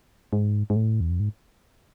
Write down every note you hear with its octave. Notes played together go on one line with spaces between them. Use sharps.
G#2
G#2
A2
E2
F2
G#2